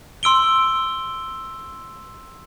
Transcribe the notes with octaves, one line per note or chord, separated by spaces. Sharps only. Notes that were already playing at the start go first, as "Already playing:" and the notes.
C6 E6 D7 G7